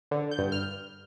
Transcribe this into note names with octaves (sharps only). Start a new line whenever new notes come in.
D3
G6
G2
F6